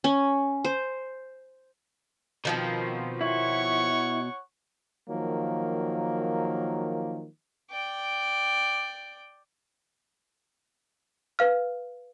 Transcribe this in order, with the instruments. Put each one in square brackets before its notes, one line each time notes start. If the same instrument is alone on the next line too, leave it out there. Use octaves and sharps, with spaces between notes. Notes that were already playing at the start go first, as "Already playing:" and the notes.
[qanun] C#4
C5
[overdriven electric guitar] B2 [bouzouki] D#3 F3 C4
[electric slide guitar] E4 [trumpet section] C#5 F#5 C#6
[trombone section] D#3 F3 F#3 A#3
[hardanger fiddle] D5 G5
[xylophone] B4 F5 F6